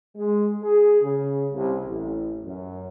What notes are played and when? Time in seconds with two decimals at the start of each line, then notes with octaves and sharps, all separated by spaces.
0.16 G#3
0.62 G#4
1.01 C#3
1.52 C2
1.86 A1
2.45 F#2